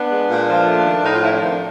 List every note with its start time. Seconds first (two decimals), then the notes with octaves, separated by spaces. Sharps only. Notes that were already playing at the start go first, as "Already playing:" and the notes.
Already playing: B3 D4
0.10 G#3
0.29 A#2
0.47 F3
0.66 A3
0.85 D#3
1.04 A2 D#4
1.13 F4
1.22 F3 E4
1.32 D4
1.41 D#3 C4
1.51 D4